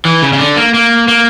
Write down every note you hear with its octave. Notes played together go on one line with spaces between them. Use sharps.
E3
C#3
C#3
D3
A#3
A#3
A#3